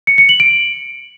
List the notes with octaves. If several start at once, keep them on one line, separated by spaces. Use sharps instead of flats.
C#7
C#7
F#7
D7